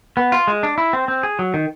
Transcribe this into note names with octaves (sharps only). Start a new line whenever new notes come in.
B3
F4
G#3
D4
E4
C4
C4
G#4
F#3
D#3